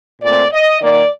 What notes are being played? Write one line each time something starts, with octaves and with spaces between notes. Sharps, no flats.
A#2 A3 C4 D5
D#5
D#3 A#3 D5